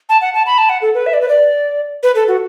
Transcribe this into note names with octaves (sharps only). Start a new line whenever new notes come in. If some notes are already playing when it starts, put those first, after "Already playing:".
A5
F#5
A5
B5
A5
F#5
A4
B4
E5
D5
B4
D5
B4
A4
F#4